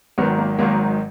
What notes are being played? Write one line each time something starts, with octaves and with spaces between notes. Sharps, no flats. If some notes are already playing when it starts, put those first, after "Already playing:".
G#1 G#2 D#3 F#3 B3
A#3
G#1 G#2 D#3 F#3 A#3